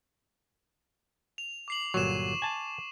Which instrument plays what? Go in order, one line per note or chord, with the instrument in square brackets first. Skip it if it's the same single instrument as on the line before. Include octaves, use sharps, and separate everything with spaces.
[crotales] F7
D6 C7 F#7
[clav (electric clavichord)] G1 A#2 F#3 [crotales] C#6 E7
[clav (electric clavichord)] G#5 A5